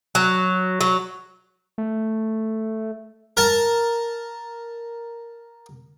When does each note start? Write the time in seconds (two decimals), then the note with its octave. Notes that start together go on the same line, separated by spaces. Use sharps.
0.15 F#3
0.81 F#3
1.78 A3
3.37 A#4 A5